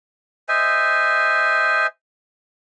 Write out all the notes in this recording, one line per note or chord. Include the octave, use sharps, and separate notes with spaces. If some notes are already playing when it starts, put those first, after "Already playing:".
C5 D#5 E5 G#5